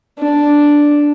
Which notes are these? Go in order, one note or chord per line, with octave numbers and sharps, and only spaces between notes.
D4